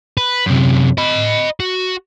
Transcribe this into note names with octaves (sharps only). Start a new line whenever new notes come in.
B4
F#2 C3
D#5 B5
F#4